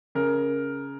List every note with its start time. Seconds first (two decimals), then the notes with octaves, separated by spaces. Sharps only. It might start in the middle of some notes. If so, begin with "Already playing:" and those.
0.15 C#3 A#4